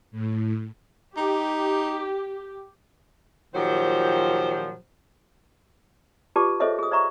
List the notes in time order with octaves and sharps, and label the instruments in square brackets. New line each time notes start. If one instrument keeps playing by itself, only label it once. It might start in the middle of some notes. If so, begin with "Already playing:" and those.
[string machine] A2
[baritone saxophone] D#4 [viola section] G4
[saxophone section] A#2 D#3 F3 F#3 G4 C5
[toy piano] F4 G4 B4 D5 A5 D6
G#4 A4 C5 C#5 D#5 E5
G#4 D#6
C5 D5 E5 A#5 C#6